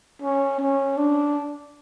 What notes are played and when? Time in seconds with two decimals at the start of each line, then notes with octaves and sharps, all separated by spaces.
0.22 C#4
0.60 C#4
0.97 D4